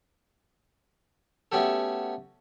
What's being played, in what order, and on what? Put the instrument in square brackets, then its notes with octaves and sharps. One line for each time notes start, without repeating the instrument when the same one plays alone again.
[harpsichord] A3 B3 C#4 F#4 G4 A4